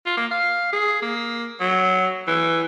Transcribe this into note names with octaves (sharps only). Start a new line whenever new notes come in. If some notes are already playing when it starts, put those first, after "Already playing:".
F4
A#3
F5
G#4
A#3
F#3
E3